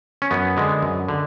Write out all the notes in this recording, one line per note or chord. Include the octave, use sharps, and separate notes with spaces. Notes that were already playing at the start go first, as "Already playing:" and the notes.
C#4
F#2 B3
D3 G#3
F#2
D3